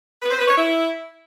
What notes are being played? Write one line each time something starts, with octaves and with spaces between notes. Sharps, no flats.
B4
C5
B4
C#5
E4